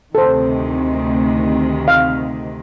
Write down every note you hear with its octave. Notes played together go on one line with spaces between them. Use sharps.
D2 C3 D#3 A4 C5
F5